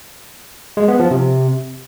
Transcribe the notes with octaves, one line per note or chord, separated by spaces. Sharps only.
G#3
B3
F3
C3